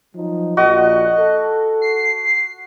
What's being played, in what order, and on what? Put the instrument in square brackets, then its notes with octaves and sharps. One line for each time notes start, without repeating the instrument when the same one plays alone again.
[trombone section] F3 F#3 D#4
[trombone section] A#1 A#2 [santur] F#4 [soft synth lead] D#5
[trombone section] A4
[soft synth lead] C7